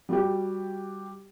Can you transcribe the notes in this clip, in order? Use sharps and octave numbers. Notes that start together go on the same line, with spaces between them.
G3 F#4 G4